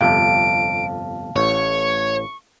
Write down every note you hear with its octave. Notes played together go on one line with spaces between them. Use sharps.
G1 F2 C3 F5 A5 D7
A1 C#5 C#6